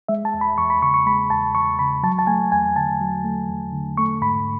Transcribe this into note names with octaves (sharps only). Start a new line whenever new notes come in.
G#3 E5
A5
E2
B5
E2 C#6
B5
C#3 C#6
C#6
G#3 B5
E2 A5
E2 C#6
C#3 B5
F#3 A5
A5
A3 G#5
E2 G#5
D3 A5
F#3
A3
E2
D3
A3 C#6
G#2 B5